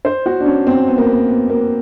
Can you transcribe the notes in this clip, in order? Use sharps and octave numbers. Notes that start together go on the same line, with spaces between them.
C5
F#4
D4
C#4
C4
B3
A#3
B3
B3
A#3